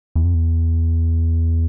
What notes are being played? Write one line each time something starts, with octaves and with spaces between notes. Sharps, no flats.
E2
F2
E2